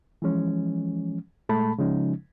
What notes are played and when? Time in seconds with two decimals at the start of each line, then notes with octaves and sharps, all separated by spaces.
0.22 E3 F3 G#3 C#4
1.49 A#2 G#3 A3 A5 B5
1.78 C#3 F3 G#3 C#4 D#4